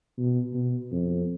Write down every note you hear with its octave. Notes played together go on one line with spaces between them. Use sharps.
B2
B2
F2